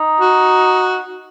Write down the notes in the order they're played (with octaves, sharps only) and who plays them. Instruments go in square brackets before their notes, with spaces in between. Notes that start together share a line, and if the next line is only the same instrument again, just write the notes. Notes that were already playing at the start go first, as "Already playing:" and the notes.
Already playing: [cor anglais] D#4
[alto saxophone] F#4